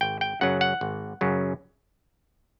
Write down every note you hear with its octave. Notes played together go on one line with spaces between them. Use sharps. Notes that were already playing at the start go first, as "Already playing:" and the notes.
G#1 G5
G5
F#2 C#3 F#3 F#5
F#5
G#1
F#2 C#3 F#3